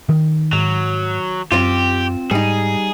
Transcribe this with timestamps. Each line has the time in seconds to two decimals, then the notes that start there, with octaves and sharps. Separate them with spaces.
0.09 D#3
0.53 G#2 F#3
1.52 F#2 C4 F4 G4
2.31 G#2 G3 D#4 G#4